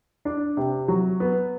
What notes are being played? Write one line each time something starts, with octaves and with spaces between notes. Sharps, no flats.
D4
C3
F#3
B3